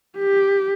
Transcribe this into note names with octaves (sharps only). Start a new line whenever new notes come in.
G4